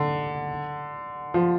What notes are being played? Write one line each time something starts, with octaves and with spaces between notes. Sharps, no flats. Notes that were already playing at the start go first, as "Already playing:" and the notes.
Already playing: D3
F3